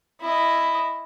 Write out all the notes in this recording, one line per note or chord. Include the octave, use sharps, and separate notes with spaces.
E4 D#5